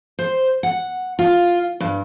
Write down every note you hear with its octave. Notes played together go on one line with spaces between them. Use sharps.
C5
F#5
F4
G2